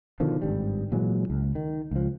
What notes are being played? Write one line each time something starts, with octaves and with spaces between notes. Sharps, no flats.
B2 D3 D#3 F3
G#1 G2 G3
A#2 E3 F#3 G#3
C#2
D#3
C#2 F3